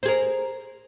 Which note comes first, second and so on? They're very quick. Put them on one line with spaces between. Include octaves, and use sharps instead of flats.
C5 G#4 A#4